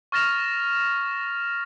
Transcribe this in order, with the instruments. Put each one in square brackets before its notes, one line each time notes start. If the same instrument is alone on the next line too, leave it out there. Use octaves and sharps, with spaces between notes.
[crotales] C#6 F6 A6 A#6 E7 F7